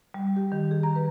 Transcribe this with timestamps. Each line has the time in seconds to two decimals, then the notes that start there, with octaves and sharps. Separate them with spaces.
0.14 G3
0.36 G4
0.52 D#3
0.71 G#4
0.83 A#5
0.95 B4